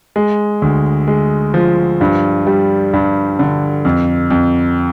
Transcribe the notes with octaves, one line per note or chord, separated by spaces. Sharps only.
G#3
D2
G#3
F3
G2
G3
G2
D3
F2
F2